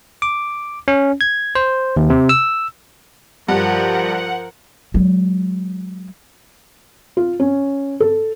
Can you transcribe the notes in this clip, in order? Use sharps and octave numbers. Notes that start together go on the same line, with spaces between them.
D6
C#4
G#6
C5
D#2
C3
E6
G2 F3 A#4 F#5
F#3 G#3
F4
C#4
A4